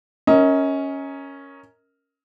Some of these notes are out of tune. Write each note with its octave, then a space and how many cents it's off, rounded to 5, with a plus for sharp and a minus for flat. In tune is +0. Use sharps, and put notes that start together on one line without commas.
C#4 +0 A#4 +0 D#5 +35